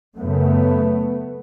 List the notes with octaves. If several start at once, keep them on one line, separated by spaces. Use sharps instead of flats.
F#2 C#3 A3 B3